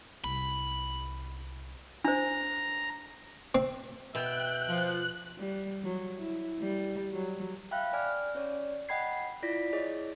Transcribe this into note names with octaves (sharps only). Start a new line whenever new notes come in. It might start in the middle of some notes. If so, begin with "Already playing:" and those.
C2 B5
D4 C5 A#5
C4
B2 E5 G5 F#6
F3
G3
F#3
E4
G3
F#3
E5 F5 G5 B5 F#6
D5 G#5 F6
C#4 C#5 D5
D#5 F#5 G5 B5 G#6 C7
E4 F4 D5 A#6 B6
E4 G#4 C#5 D#5